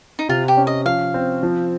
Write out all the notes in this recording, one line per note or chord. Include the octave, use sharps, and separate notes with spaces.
D#4
C3 F4
G4
C#4
D#5
F3 F5
C4
F3